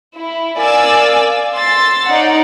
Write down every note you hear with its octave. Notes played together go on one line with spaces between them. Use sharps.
E4
A#4 D5 F5 G#5 E6 A6
C6 E6 A6
D#4 C#5 D5 F#5